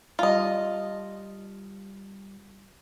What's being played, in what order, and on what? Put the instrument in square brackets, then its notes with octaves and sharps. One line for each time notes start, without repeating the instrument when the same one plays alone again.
[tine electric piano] G3 A5 F6 [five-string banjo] F4 D#5